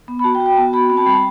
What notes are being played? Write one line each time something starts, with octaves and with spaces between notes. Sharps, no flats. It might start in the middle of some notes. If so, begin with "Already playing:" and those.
B3
B5
F#4 A5
G5
F#4
G5
B3 A5
F#4 B5
C4 B5
A5
G3 B5
A5